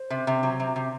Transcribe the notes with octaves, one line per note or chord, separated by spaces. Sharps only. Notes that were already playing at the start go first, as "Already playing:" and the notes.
Already playing: C5
C3
C3
F#3
C3
C3